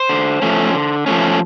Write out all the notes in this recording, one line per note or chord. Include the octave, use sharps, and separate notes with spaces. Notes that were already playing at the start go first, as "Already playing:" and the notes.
Already playing: C5
D3
F3 A3 C#4
D3
F3 A3 C#4